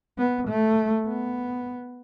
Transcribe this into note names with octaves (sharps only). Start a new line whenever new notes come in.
B3
A3
B3